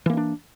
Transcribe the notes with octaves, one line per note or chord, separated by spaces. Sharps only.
E3 A#3 C#4 D4